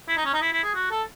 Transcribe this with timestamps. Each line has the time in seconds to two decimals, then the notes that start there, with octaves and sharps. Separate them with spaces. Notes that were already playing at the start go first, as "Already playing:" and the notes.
0.08 E4
0.17 D#4
0.25 C#4
0.34 D#4
0.41 E4
0.53 E4
0.64 G#4
0.75 F#4
0.91 A4